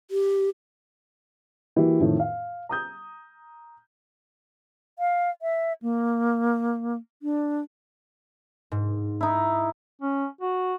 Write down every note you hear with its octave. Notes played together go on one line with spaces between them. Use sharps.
G4
E3 A#3 E4 F#4 G4
F2 A2 D#3
F5
A#5 D#6 G6
F5
E5
A#3
D4
G#2
D#4 E4
C#4
F#4